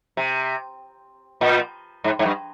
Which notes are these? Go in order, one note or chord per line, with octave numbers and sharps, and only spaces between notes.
C3
A#2
G#2
G#2
G2